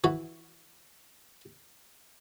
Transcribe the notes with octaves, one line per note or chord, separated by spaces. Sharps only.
E3 F#4